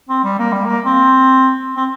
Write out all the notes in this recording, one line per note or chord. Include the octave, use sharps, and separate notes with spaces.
C4
G3
A#3
G3
A#3
C4
C4